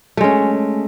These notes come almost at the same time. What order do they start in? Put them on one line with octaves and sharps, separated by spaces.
A3 G#3 C#4